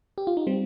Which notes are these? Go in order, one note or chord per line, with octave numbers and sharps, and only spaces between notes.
G4
F4
D#4
G3 C4